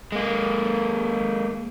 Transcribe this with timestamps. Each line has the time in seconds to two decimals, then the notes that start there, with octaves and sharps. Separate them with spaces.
0.12 G#3 A#3